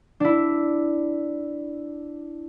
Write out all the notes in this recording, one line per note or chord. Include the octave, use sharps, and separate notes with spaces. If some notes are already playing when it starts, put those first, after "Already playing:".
D4 E4